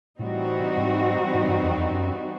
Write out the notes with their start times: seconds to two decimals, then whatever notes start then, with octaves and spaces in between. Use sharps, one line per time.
0.19 A2 E3 G3 C4 D#4 F#4
0.77 G#2
1.34 G#2
1.48 G2
1.63 F2
1.77 F2
1.91 F#2